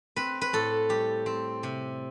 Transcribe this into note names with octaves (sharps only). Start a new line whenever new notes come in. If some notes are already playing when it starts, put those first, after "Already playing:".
C4 B4
B4
A2 A4
G3 G4
C4
C3